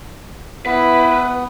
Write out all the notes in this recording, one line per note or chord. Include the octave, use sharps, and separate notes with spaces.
B3 E4 B4